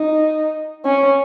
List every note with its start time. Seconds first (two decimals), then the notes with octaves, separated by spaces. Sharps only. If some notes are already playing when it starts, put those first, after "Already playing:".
Already playing: D#4
0.85 C#4